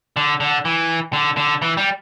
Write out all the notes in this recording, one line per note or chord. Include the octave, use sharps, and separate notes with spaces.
D3
D3
E3
D3
D3
E3
G3